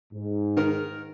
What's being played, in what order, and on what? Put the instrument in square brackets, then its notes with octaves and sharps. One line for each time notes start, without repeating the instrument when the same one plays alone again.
[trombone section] G#2
[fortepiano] D#3 A#4